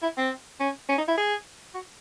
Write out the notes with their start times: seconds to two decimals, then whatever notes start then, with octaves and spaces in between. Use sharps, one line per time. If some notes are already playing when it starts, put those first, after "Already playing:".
0.02 E4
0.17 C4
0.60 C#4
0.89 C#4
0.98 D#4
1.08 E4
1.17 G#4
1.74 F#4